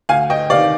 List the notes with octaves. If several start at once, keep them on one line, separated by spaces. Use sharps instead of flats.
D2 F5 G#5
D#5 G5
C3 D#3 D5 F5